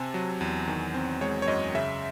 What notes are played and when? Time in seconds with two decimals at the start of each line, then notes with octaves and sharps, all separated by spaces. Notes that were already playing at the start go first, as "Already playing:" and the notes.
Already playing: C3 C4 G#5 A5
0.14 F#3
0.41 E2
0.68 D#3
0.94 C4
1.21 G#3 C#5
1.42 C#5
1.48 F#2 D#5
1.75 C#3 E5